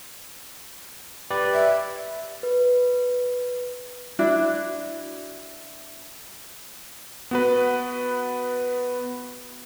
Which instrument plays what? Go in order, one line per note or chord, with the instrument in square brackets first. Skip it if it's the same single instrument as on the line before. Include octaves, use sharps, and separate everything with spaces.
[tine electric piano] G4 B4 D5
[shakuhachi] E5
[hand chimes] B4
[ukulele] D4 E4 F#4
[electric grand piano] B3 F#4 B4